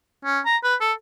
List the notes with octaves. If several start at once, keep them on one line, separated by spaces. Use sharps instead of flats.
C#4
A#5
B4
A4